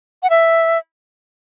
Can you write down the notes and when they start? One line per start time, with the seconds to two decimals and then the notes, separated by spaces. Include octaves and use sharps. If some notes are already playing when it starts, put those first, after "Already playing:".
0.23 F#5
0.30 E5